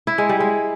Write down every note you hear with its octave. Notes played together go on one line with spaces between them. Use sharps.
E4
G#3
G3
G#3